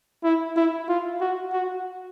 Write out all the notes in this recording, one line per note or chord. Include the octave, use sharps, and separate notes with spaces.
E4
E4
F4
F#4
F#4